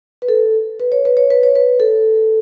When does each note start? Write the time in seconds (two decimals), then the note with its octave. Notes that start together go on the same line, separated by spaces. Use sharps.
0.22 B4
0.28 A4
0.80 B4
0.92 C#5
1.05 B4
1.17 C#5
1.30 B4
1.43 C#5
1.55 B4
1.80 A4